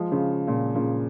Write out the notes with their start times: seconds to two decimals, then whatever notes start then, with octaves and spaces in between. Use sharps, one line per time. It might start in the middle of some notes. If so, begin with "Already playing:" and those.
Already playing: F3 G#3
0.12 C#3 F3
0.47 A#2 C#3
0.75 A#2 C#3